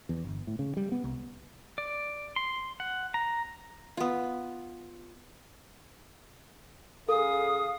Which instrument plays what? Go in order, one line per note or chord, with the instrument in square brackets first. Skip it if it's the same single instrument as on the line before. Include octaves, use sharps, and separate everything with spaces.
[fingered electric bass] E2
G1
A2
C#3
G3
B3
C2
[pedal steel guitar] D5
C6
F#5
A#5
[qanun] B3 F4
[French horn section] C#3 G#4 [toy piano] A4 [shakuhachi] F5 [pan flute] D#6